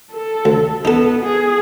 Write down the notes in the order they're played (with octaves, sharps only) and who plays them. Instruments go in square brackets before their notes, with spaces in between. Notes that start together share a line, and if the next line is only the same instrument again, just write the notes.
[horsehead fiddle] A4
[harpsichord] D2
[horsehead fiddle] B3 [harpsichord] D#4 A4
[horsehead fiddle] G#4